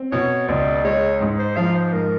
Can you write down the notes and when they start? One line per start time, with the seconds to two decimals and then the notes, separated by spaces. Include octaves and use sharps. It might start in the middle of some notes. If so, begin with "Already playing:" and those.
Already playing: C4
0.12 B2 C#5
0.48 C#2 D5
0.84 G#3 C#5
1.21 G#2
1.39 C5
1.57 F3 F5
1.75 C5
1.93 G#2 A#4